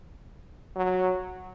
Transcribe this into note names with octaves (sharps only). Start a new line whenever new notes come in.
F#3